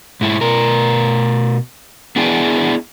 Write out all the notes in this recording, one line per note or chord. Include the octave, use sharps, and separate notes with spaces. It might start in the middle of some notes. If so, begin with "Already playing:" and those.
G#2 E4
B2 A#4
B3 D4 E4 G#4 G5